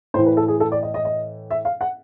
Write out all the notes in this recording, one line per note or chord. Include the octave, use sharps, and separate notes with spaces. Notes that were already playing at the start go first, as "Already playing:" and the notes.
A2 E3 C5
B4
A4
G#4
A4
D5
D#5
D#5
D#5
E5
F5
F#5